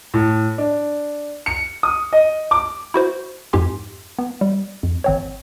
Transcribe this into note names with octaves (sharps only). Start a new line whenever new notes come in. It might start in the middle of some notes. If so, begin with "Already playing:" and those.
A2
D4
C#7
D#6
D#5
D6
E4 F#4 C5
F2 G#2 G4 G#5 C6
B3
G3
F2
G#1 C4 C#5